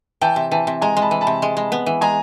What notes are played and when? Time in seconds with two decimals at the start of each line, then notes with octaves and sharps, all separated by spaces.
0.21 E3 G5 A5
0.36 C3
0.51 E3 G5 A5
0.67 C3
0.82 G#3 G#5 A#5
0.97 G#3
1.02 A5 B5
1.11 E3
1.21 A5 B5
1.27 C3
1.42 G#3
1.57 G#3
1.72 B3
1.86 E3
2.01 G#3 G#5 A#5